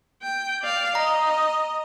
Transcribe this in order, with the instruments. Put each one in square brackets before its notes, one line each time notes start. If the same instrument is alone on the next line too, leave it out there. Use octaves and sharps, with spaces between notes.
[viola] G5
D5 F5
[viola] D#5 [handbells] A#5